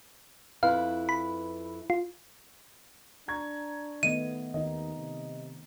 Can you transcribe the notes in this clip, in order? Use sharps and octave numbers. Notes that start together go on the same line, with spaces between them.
F2 E4 B4 F5
B5
F4
D4 A#5 C#6 G#6
D#3 A3 B3 D#5 D#7
D#2 D#3 D#4 D#5
C3